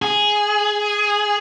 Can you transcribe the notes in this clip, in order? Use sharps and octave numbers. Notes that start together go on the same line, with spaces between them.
G#4